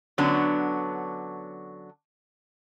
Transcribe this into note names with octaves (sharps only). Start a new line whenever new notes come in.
D3 F#3 B3 C#4 D4